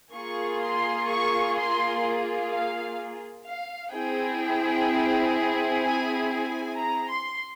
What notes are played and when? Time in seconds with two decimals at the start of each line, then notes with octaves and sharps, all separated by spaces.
0.13 A#3 F4 G#4 C#6
0.61 C6
1.08 C#6
1.55 C6
2.50 F5
3.45 F5
3.92 C4 E4 G#4 G5
5.82 G#5
6.30 G#5
6.77 A#5
7.09 C6